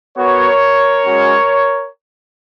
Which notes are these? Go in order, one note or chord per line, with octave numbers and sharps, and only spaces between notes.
B3 F#4 A#4 C#5
G#3 C#4 F#4